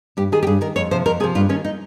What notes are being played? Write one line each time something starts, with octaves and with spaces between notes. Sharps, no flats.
G2 G4
D#3 G#4
G4
G2 G#4
D#3 A#4
F2 C#5
C3 F3 C5
F2 A#4
C3 F3 G#4
G2 F4
D#3 C#4
D#4